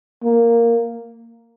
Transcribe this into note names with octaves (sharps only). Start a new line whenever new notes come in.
A#3